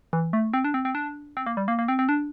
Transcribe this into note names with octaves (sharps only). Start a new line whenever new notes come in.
E3
A3
C4
D4
C4
C4
D4
C4
A#3
G3
A#3
A#3
C4
C4
D4